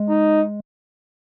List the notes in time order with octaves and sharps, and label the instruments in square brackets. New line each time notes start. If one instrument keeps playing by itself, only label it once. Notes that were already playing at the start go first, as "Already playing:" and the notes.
Already playing: [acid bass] G#3
[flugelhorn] D#4